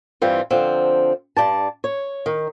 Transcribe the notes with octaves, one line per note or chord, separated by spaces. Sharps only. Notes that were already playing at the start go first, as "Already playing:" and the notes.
G2 E3 G3 C4 F4
D3 F3 C4
G2 D5 A5
C#5
D#3